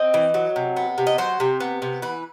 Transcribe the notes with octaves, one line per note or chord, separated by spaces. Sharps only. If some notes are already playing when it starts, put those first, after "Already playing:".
Already playing: C4 D#5
E3
F#3
C3
B3
C3
D#5
F#3 C5
C3
B3
C3
E3 B4